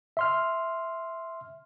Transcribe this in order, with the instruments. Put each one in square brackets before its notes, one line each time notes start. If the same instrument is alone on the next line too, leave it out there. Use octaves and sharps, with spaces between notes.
[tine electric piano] E5 C6 F6